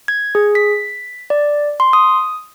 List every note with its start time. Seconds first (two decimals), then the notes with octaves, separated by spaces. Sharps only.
0.08 G#6
0.35 G#4
0.55 B6
1.30 D5
1.80 C6
1.93 D#6